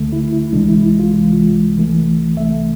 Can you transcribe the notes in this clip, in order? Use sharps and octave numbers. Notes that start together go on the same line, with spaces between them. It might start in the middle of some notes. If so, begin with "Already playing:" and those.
Already playing: D2 D3 A3
E4
E4
C2 C3 E3 G#3 D4
E4
E4
F4
C2 C3 E3 G#3
C2 C3 E3 A3
C2 C3 E3 A3 E5